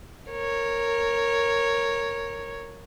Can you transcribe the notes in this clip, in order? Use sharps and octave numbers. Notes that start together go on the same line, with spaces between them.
A#4 C#5